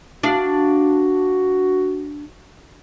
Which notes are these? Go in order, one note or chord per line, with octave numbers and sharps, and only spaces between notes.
D4 F#4 F5